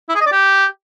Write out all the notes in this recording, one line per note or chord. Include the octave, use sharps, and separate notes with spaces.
E4
G#4
D#5
D5
G4